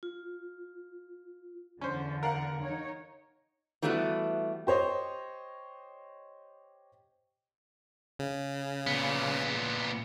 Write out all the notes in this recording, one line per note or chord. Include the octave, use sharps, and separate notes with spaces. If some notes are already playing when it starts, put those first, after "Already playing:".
F4
E2 D3 C#4 C5
A#4 F5 F#5
D#4 C#5
E3 G3 A3 B3 D#4 F#4
G4 C5 C#5 D#5
C#3
A#2 B3